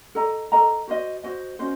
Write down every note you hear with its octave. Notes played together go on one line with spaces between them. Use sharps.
A4 D#5 A#5
A4 D#5 A#5
F#4 C5 D#5
F#4 C5 D#5
C#4 F#4 C5 D#5